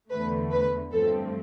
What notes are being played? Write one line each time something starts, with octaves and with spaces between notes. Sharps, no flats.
E2 D3 A3 B4
B4
G2 F3 A3 C4 A4